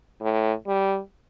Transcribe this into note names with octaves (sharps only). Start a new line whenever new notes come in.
A2
G3